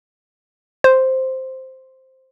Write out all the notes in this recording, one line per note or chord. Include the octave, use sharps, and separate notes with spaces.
C5